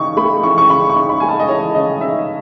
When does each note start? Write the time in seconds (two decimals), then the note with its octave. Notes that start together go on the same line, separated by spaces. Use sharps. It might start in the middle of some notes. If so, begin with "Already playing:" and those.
Already playing: C#3 E3 D#4 C#6
0.17 A3 B5
0.43 E3 C#6
0.58 C#6
0.70 C#3 B5
0.89 C#6
0.96 D#4
1.09 B5
1.20 A3 G#5
1.29 A5
1.39 D#5
1.48 E3 C#5
1.75 C#3 D#5
2.01 D#4 E5